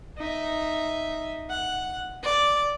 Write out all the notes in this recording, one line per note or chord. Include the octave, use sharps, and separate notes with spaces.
D#4 E5
F#5
D5